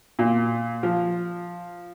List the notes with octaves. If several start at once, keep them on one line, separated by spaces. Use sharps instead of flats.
A#2
F3